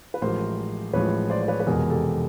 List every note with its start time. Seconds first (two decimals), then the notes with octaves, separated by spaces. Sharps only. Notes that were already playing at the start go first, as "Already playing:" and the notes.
0.14 B4
0.22 A1 A2 F3 G#3 A#4 C5
0.93 A1 A2 F3 G#3 B4 C#5
1.30 C5 D5
1.42 C5
1.48 B4 C#5
1.60 B4
1.66 F1 E2 B2 G#3 G#4 A#4
1.90 G4 A4